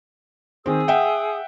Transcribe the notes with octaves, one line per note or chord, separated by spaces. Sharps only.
D#3 C4 G#4 D#6 E6
E5 F#5 G5